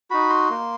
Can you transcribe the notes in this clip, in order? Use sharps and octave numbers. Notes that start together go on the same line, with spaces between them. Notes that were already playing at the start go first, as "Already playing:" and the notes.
D#4 F#4 B5
C6
A#3